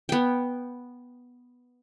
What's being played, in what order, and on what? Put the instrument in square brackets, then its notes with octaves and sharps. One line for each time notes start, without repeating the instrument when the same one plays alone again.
[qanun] B3 G5